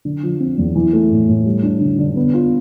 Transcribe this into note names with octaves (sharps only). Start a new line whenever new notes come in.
D3
F3
C4
E2
E3
A3
A2
A2
G3
D4
D3
D3
B3
F4